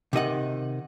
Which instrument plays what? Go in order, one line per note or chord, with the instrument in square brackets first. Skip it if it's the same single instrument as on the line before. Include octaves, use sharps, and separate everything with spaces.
[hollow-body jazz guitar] C3 D#3 D#5 F#5